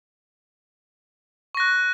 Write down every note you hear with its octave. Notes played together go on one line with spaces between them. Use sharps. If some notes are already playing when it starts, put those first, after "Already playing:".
C#6 F#6 A#6